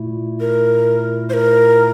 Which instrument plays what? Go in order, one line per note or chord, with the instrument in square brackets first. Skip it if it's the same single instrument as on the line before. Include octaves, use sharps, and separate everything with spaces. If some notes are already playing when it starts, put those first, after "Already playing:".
Already playing: [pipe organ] A#2 A3 E4
[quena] A#4
C5
A#4